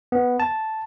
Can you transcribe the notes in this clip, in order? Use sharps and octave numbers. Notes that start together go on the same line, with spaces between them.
B3
A5